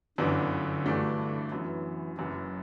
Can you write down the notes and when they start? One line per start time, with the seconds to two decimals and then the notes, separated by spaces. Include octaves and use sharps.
0.18 G1 F#2 D3 E3 B3 D4
0.85 G2 E3 A3 D4 F#4
1.51 F#2 E3 F#3 B3
2.17 F#1 F#2 E3 F#3